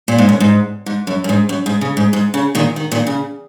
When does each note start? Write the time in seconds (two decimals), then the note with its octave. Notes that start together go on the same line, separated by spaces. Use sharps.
0.08 A#2
0.18 G#2
0.29 F#2
0.40 G#2
0.86 G#2
1.07 F#2
1.24 F#2
1.29 G#2
1.49 F#2
1.66 G#2
1.81 C#3
1.97 G#2
2.13 G#2
2.34 C#3
2.55 A#2 D#3
2.76 D#3
2.92 A#2 D#3
3.07 C#3